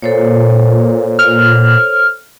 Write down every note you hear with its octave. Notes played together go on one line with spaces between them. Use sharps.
A#2 A4 C5 C#5
F6